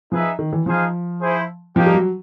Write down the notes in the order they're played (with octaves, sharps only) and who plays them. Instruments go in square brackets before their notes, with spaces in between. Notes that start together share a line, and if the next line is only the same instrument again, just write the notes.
[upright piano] F3 [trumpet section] D#4 G#4 B4 E5
[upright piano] D#3
E3
[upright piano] F3 [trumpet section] D#4 G#4 C5 F5
[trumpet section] E4 G#4 C5
[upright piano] F3 [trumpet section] A#3 D#4 G4
[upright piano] G3
F#3